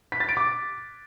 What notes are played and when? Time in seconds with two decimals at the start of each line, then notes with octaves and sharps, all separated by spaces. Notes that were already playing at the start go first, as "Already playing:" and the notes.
0.12 B6
0.20 A6
0.29 D7
0.37 D6